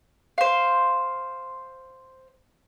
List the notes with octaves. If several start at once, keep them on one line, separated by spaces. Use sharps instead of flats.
C5 F5